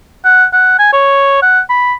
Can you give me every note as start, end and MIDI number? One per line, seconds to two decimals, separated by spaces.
0.25 0.45 78
0.53 0.79 78
0.79 0.88 80
0.93 1.41 73
1.42 1.60 78
1.69 1.93 83